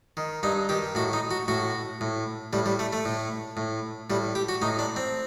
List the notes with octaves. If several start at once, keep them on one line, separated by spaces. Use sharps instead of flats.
D#3
G2 D#4
D#3 G4
A2 F#4
D#4
F#4
A2 F#4
A2
A2 G3
G3
A3
A3
A2
A2
A2 G3
G4
F#4
A2 D#4
D4
C4